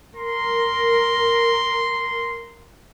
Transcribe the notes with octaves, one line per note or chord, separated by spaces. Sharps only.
A#4 C6